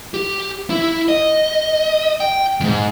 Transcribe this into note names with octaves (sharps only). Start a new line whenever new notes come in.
G4
E4
D#5
G5
F2 G#2